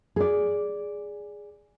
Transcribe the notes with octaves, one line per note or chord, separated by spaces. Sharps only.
G#4 D5